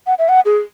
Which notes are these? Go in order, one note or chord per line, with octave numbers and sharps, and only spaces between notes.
F#5
E5
F#5
G#4